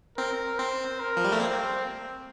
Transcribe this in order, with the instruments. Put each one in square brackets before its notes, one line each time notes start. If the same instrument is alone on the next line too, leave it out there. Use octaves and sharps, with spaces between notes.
[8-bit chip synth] C4 [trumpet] A#4
[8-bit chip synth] C4 [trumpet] C5
[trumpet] A#4
[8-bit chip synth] F3
G3
A3
[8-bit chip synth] A#3 [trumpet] C4